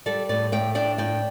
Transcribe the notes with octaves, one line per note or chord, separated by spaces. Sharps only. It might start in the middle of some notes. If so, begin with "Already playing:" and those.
G3 A4 D5
A2 A4 D5
A2 D5 G5
D4 D5 G5
A2 D5 G5